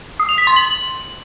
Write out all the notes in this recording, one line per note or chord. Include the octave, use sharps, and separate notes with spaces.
D#6
F7
B6
C6
F#7